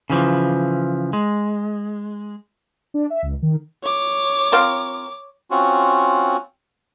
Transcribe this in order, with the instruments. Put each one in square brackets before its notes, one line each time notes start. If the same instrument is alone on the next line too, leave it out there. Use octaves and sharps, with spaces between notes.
[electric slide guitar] C#3 E3 F3
G#3
[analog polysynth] D4
E5
C#2
D#3
[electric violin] C#5 D6
[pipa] C4 F4 A#4
[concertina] C4 C#4 F4 F#4